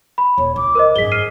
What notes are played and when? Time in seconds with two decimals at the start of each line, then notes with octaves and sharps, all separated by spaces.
0.18 B5
0.38 D#1 C#5
0.56 C#2 D6
0.75 A#4 C5 D#5
0.96 G#1 F#2 G#4 B6 G7
1.12 F6 C7 D#7